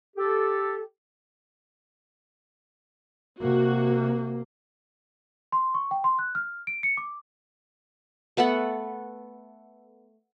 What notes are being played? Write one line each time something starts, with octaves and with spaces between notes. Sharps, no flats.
G4 A4
C3 A#3 F#4
C6
C#6
G5
C6
F#6
F6
D7
C#7
D6
A3 B3 A4 F#5